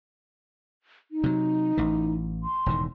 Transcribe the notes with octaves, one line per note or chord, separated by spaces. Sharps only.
D#4
C3 F#3
A1 E3
C6
E1 A2 D#3